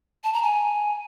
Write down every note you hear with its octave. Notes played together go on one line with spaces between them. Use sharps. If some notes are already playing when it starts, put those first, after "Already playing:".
A5
A#5
G#5